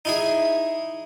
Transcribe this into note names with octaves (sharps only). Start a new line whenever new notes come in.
D#4 E4 G#4